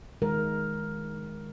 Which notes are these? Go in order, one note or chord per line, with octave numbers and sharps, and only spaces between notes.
D#3 G#3 A#4